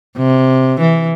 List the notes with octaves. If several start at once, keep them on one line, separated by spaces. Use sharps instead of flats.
C3
E3